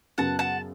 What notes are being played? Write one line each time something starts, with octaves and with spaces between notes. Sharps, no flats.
F#2 C#3 F#3 B3 F#5 A5
F#5 A5